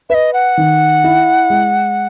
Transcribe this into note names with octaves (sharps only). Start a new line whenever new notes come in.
B4 D#5 E5
F#5
D#3
E4
G#3